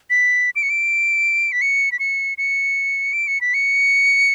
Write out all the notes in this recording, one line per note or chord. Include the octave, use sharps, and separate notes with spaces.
B6
D7
C#7
D7
B6
C#7
B6
C#7
C#7
D7
C#7
B6
C#7